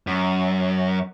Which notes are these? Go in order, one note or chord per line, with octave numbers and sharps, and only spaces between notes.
F#2